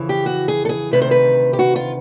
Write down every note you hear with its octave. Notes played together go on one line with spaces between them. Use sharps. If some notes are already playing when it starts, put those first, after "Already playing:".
Already playing: F2 C#3 E3
G4
F#4
G#4
A4
G#4
D2 C3 D#3 B4
C5
B4
G4
F#4
F4